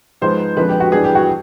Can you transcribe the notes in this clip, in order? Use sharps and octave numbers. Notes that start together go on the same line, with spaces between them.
G#2 F3 G#3 B3 C5
F2 D3 F3 G#3 B4
G4
F#4
G2 E3 G3 B3 G#4
G4
F#4